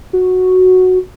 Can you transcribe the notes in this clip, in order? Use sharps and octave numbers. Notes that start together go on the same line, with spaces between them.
F#4